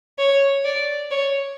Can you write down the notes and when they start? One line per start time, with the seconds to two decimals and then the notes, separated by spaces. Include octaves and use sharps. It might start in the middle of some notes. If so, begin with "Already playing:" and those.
0.19 C#5
0.65 D5
1.11 C#5